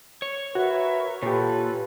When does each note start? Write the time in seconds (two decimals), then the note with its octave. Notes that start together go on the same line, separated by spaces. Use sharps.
0.22 C#5
0.55 F#4 A#4 B4 E5
1.22 A#2 F4 G4 A4 B4 C#5